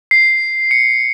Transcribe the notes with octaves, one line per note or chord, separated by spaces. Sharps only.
C7
C#7